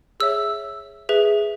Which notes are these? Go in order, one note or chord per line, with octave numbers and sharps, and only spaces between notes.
G#4 C#5 E5 E6
G#4 B4 E5